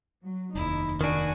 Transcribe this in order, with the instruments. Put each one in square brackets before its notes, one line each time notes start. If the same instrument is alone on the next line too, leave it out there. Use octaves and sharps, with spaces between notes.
[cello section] F#3
[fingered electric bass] F1 D#2 [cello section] D#4 [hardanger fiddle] E4
[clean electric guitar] D#3 D4 [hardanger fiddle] F#4 G#5